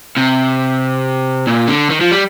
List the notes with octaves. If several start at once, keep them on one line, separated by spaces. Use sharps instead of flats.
C3
A#2
D3
D#3
F3
G3